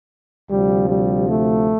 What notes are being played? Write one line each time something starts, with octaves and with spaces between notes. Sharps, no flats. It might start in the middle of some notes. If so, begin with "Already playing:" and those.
D2 C3 F3 G3
G3
A3